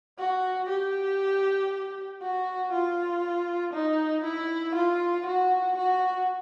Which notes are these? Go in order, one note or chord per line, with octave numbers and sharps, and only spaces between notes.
F#4
G4
F#4
F4
D#4
E4
F4
F#4
F#4